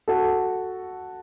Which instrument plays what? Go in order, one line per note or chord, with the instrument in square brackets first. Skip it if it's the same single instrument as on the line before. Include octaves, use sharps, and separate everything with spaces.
[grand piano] F#4 A4